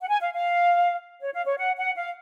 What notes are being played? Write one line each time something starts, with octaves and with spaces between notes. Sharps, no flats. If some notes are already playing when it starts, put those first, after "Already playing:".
F#5
G#5
F5
F5
C#5
F5
C#5
F#5
F#5
F5